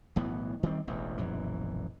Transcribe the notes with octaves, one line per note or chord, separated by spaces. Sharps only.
B1 A2 E3 B3
D#3 G3 C4
E1 A1 E2
E1 A#1 F#2 E3